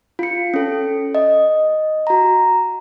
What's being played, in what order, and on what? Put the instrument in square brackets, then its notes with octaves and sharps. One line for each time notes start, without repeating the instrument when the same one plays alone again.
[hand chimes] F4 C#7
C#4 A4
D#5
F#4 A#5